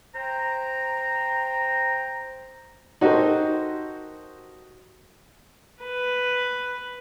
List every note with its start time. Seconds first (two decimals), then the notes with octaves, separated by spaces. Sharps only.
0.15 C5 G5 A#5
3.01 D#4 F#4 G4 A4 A#4 C5
5.83 B4